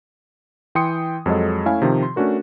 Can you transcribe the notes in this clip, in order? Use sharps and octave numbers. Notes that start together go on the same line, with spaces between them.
E3 G5 C6 D#6 C#7
F2 F#3 G#3 A4 D#5
A3 C#4 E4 C#5 F5 G#5
C3 D#3 F3
C6
A3 C#4 D4 F#4 A#4